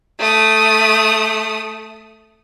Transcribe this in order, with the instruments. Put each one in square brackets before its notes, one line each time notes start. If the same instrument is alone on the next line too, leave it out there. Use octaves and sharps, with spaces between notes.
[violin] A3 D#6